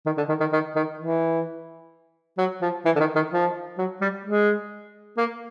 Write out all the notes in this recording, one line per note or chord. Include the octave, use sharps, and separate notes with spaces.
D#3
D3
D#3
D#3
D#3
D#3
E3
F#3
F3
E3
D3
D#3
D#3
F3
F#3
G3
G#3
A#3